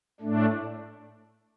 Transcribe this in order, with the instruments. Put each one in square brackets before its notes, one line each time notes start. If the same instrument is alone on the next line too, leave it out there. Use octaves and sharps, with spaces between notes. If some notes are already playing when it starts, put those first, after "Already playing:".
[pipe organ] A2 A3 D4